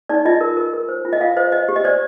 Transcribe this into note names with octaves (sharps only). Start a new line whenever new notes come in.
D#4 D5
F4 D#5
A#4
A#4
A#4
C5
F4
D#5
F4 F5
C5 D#5
C5 D#5
G4
D#5
C5 D5